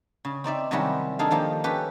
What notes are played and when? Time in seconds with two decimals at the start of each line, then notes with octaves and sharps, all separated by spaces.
0.25 C#3
0.44 C4 D#4 D5 E5
0.71 C3 D#3 F#3 G3 C#4 E4
1.19 D4 D#4 G#4 A4 F5
1.31 D#3 F3 A#3 G4
1.64 C#4 G4 A4 B4